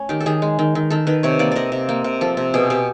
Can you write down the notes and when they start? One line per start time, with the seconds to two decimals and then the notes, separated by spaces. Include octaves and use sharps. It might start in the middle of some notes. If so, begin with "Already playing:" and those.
Already playing: A3 C#4
0.09 D#3 G4
0.20 A4
0.26 D#3 G#4
0.42 G#3
0.59 D#3
0.75 D#3
0.90 D#3 A4
1.07 D#3 B4
1.23 C3 C#5
1.39 A#3 D5
1.52 C3 D5 D#5
1.72 C3
1.89 A#3
2.04 C3
2.21 F3 A4
2.37 C3
2.54 B2 G#4
2.70 B2 G4